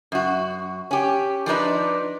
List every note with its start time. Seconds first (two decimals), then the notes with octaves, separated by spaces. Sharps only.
0.12 F#2 F#4
0.91 C#4 G4
1.46 F3 D4 D#4 B4